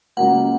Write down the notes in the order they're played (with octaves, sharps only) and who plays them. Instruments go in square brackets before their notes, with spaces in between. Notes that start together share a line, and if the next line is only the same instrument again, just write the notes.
[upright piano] C#2 C#3 F#3 A#3 [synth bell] F#5